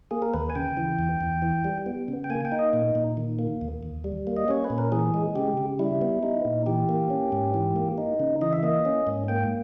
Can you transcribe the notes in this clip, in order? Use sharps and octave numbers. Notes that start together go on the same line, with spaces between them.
A#3 G#4
A#4
D#2 B4
G#5
C#3 G5
E3
E2
E2
E3
G3
B3
C#3
G5
A#3 G#5
G5
D#4
D#5
A#2
A#2
D#3
A#3
D#2
D#2
G3
A#3
D#5
C#4 C#5
B4
A#2
A#4
E3 G#4
G#3
C#3 G4
C#3
G3 E4
B3
D#4
A#2
E3 G4
A#3
C#4
G#2
E3
A#3
D#4
C#3
E3 D#5
E5
A#3 D#5
C#4
G#2
A#3 G5